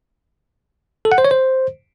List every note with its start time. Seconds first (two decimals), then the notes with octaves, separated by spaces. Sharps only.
1.05 A4
1.12 F#5
1.18 C5
1.25 C#5
1.31 C5